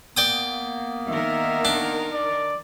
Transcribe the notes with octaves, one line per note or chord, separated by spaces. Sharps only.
A#3 B3 D5 G5 D#6
D#3 A#4 E5
D4
D5